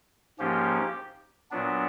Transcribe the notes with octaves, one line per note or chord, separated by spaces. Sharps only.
G#2 F3 A#3 C#4 G4
A#2 F#3 B3 D4